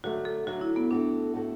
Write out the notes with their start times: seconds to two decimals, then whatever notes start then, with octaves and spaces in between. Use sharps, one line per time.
0.04 D3 F#3 A3 F#4
0.25 A4
0.47 D3 F#3 A3 F#4
0.61 E4
0.76 B3
0.91 A2 A3 D4 F#4 A4
1.34 A2 A3 F#4 A4